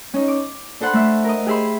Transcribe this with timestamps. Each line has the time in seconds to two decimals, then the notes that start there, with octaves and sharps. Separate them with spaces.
0.14 C#4 D#4
0.28 D6
0.80 D4 A4 C5 F#5 B5 C6
0.94 A3 E5
1.24 A#4 D#5
1.46 G4 G#4 E5 B5 C6